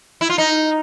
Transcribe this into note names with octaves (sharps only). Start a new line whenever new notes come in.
E4
F4
D#4